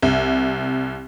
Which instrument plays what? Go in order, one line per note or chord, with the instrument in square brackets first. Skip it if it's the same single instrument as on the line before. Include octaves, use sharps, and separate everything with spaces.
[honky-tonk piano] C2